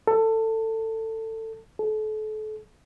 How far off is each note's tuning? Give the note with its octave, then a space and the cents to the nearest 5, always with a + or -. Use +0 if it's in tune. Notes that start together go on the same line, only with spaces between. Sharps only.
A4 +20
A4 -35